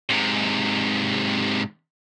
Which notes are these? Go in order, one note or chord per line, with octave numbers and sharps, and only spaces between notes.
G#2 C3